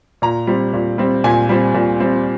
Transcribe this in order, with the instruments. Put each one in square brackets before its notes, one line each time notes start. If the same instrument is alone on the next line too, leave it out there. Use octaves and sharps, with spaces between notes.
[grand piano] A#2 A#5
G3 C4
A#2
G3 C4
A#2 G#5
G3 C4
A#2
G3 C4